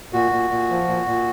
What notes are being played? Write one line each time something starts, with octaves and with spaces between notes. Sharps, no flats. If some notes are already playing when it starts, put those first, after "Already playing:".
A#2 F#4
A#2
A#2
F3
A#2
A#2